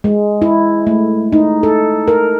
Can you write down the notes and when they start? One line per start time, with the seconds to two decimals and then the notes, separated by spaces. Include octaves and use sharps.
0.04 G#3
0.42 E4
0.87 A3
1.32 D#4
1.63 A4
2.08 A#4